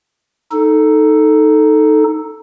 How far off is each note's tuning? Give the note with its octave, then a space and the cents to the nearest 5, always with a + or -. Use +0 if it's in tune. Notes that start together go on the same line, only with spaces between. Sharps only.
D#4 +0 A4 +0